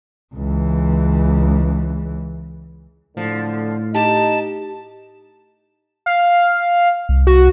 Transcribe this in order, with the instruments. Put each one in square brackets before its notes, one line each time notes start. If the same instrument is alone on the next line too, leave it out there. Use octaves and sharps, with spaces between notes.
[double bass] C#2 E3
[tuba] A2 [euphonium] D3 [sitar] F3
[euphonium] D#4 [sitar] G4 [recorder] A5
[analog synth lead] F5
[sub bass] C2
[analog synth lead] F#4